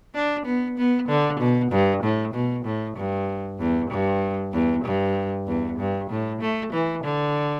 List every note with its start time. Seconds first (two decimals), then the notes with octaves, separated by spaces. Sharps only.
0.15 D4
0.46 B3
0.78 B3
1.08 D3
1.40 B2
1.71 G2
2.03 A2
2.34 B2
2.65 A2
2.97 G2
3.59 E2
3.91 G2
4.53 E2
4.84 G2
5.47 E2
5.79 G2
6.10 A2
6.41 A3
6.73 E3
7.04 D3